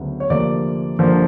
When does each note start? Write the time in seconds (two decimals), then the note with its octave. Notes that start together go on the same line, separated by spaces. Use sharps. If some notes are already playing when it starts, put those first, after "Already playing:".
Already playing: D2 C#3 F#3 B3
0.20 C#5
0.29 D2 C3 F3 A#3 D5
0.99 G2 D3 F3 A#3